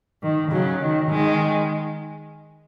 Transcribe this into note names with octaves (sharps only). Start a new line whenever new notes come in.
D#3
C#3 F#3
D#3
D#3 G#3